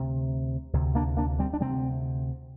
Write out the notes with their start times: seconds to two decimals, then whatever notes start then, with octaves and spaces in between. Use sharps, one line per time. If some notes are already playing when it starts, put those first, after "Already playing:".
Already playing: D2 C3
0.73 D2 C3
0.95 A#3 D4
1.17 A#3 D4
1.39 G3 C4
1.53 D4
1.61 D2 C3 G3 C4